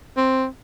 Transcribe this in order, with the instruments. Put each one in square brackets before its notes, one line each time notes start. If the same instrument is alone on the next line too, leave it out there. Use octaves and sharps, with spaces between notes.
[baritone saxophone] C4